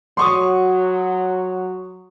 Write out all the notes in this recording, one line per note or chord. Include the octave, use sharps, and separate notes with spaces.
F#3 C6 C#6 D#6